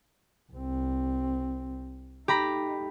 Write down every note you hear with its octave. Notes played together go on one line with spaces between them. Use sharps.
C2 C4
A3 D#4 G4 A#5 B5